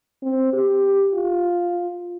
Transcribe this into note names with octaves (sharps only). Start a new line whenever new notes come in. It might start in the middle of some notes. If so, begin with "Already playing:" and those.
C4
G4
F4